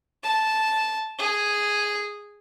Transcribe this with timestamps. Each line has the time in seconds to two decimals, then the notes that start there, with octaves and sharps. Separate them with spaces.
0.23 A5
1.19 G#4